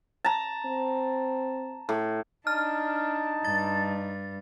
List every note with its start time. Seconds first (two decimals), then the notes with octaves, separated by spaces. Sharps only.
0.25 A5 A#5
0.66 C4
1.89 A2
2.47 D4 D#4 A5 F6
3.45 G2 A6